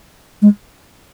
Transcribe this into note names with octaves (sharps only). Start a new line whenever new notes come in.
G#3